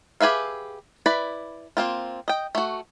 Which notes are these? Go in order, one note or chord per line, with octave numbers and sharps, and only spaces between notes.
G4 G#4 B4 E5 F5
E4 B4 D5 B5
A#3 C4 F4
D#5 G5
A3 F#4